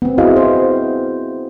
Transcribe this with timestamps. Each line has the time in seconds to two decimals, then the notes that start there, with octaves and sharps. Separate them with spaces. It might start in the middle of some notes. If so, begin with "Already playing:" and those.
0.02 B3 C4
0.18 E4 F#4 G#4 D#5 F5
0.36 C5